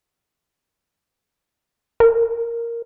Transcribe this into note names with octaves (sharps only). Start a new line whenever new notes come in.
A#4